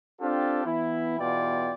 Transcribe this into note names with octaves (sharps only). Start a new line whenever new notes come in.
C4 D4 F4 G4 A4
E3 B3 E4
E2 B2 F4 D5 G5